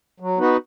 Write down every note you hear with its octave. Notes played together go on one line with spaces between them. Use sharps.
F#3
B3 D#4 F#4 B4